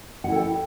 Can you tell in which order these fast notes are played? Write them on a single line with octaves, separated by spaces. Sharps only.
F#5 E4 A4 G5